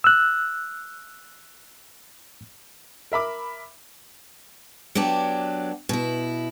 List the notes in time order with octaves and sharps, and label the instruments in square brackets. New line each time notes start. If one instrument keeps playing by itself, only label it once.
[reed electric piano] E6 F#6
[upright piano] A#4 E5 B5 D6
[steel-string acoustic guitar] F#3 B3 D4 G4
B2 E4